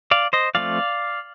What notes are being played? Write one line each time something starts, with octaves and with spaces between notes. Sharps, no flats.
D5 F5
C5 D#5
F3 A3 C4 D5 F5